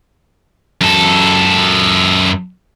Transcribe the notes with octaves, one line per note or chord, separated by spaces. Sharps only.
F#2 A4